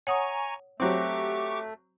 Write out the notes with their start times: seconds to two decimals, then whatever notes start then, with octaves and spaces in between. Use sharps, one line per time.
0.07 C#5 F#5 G#5 A#5 C#6 D#6
0.80 F#3 A3 C4 G4 C#6 D6